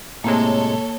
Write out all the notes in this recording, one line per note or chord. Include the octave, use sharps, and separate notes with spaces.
A2 C3 G#3 A#3 A4 C#5